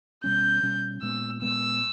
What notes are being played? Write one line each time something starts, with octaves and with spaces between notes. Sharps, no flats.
B2 G3 C#4 G6
B2 G3 C#4
A#2 G#3 B3 E6
A#2 G#3 B3 E6